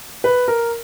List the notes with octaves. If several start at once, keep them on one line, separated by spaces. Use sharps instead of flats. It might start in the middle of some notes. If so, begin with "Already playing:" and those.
B4
A#4